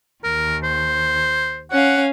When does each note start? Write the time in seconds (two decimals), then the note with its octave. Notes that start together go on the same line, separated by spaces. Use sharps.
0.24 D#2 A#4
0.64 C5
1.71 C#4 F5 F#5